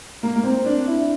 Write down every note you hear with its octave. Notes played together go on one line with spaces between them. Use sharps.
A#3
A#3
C4
D4
E4